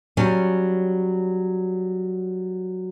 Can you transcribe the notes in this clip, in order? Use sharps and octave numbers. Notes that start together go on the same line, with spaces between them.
F#3 G3 C#4